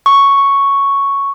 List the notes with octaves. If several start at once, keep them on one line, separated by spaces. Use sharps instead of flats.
C#6